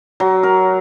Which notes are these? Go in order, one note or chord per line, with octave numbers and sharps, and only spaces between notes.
F#3
A#4